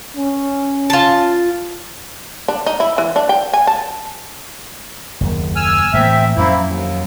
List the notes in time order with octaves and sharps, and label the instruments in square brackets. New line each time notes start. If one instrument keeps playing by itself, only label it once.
[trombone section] C#4
[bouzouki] F4 A5
[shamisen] D4
D#4
E4
E3
D4
G5
G#5
A5
[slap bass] F#1 D#2
[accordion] G#5 E6 F6
[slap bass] A2 E3 A#3 [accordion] C4 E5
[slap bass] F2 F#3 C#4 [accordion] A#3 C4 E4
[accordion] D#2